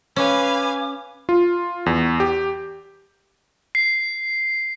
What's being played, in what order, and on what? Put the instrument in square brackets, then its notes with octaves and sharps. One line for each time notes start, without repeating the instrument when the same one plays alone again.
[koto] C#4 [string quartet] B4 F5 G#5 [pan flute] D6
[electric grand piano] F4
E2
G4
[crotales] C7